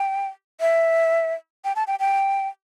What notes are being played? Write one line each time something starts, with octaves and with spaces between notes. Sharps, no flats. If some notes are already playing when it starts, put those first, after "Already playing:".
Already playing: G5
E5
G5
A5
G5
G5